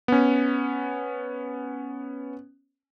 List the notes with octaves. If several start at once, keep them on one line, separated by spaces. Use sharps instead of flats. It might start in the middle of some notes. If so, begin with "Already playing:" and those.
B3 C#4